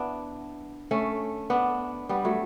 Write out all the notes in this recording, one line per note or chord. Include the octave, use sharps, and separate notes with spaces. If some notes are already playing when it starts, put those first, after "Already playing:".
Already playing: B3 D4 E4
A3 C#4
B3 D4
G3 B3
F#3 A3